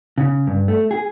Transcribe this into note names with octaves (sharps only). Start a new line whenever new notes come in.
C#3
G2
A3
G#4